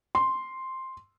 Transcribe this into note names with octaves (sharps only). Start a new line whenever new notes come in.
C6